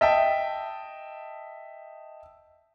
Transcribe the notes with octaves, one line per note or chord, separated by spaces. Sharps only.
D#5 E5 G5 A5